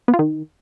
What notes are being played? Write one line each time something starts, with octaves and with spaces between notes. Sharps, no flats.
B3
F4
D#3